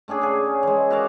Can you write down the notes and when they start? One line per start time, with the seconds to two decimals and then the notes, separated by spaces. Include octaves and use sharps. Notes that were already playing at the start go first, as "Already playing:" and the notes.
0.08 A3 C#4 D4 G#4
0.21 C#3 G#4
0.63 E3 G#3
0.91 F#4 A#4 D5 F5